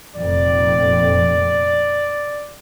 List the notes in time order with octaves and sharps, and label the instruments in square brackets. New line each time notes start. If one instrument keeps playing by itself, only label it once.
[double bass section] F1 F2 A#2 [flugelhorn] D5